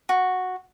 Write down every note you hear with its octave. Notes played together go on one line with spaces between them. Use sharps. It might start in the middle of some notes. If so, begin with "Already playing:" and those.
F#4